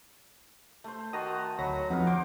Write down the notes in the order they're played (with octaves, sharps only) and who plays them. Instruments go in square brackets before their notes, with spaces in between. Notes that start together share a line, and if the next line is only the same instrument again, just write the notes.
[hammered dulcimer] A3 C5
[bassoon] D#3 [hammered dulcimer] F#4 [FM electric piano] A5 A#5 D#6
[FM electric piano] D2 B5 A#6 [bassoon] F#3
[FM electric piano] F2 [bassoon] B3 [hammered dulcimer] D#4 G#4 F5
[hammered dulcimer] C5 [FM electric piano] D6